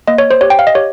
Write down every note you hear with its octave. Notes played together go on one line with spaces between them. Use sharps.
A#3 D#5
C#5
C5
G4 C#5
G5
F5
D#5
G4 C#5